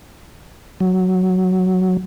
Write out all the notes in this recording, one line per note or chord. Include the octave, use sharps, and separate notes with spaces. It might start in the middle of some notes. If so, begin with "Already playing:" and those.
F#3